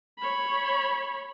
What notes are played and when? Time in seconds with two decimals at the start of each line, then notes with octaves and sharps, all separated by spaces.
0.18 C#5 B5